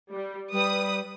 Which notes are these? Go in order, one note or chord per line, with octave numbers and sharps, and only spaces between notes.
G3
G3 B4 D#6